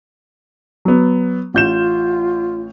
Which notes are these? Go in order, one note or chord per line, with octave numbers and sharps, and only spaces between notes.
F#3 B3
A1 F4 G6 E7